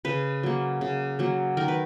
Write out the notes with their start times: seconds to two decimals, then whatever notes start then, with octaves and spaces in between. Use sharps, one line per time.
0.05 C#3 B4
0.43 F#3 A#3
0.81 C#3
1.19 F#3 A#3
1.57 D#3 A#4
1.68 B4